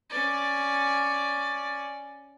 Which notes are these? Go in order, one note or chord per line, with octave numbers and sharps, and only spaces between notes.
C#4 D5